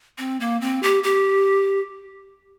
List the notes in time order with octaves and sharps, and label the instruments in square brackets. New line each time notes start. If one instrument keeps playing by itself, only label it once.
[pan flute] C4
A#3
C4
G4
G4